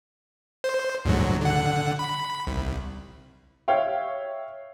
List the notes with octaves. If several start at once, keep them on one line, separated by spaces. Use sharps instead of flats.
C5
D2 G#2 F#3
D3 F#5
B5
C2
C#5 E5 F5 G5